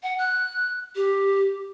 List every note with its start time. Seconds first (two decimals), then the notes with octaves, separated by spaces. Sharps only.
0.03 F#5
0.19 F#6
0.96 G4